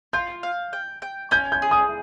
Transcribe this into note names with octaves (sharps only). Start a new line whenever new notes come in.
F4 G6
F5
G5
G5
C#4 G6
G6
G#4
D#6